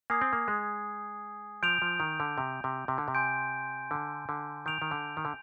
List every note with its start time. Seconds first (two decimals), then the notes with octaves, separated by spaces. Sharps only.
0.10 A#3 G#5 D#6 G#6 C7
0.21 C4
0.33 A#3
0.48 G#3
1.63 F3 G6 D7 F7
1.82 F3
2.00 D#3
2.20 D3
2.38 C3
2.64 C3
2.88 C3
2.98 D3
3.08 C3
3.15 G#5 C6 G6 D7
3.91 D3
4.29 D3
4.66 D#3 G6 D7 F7
4.82 D#3
4.91 D3
5.17 D#3
5.25 D3